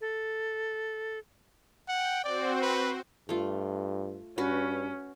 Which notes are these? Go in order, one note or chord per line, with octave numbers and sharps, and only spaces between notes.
A4
F#5 G5
C4 F#4 C5 D5
B4
G2 A3 F4
G2 C#4 F#4 B4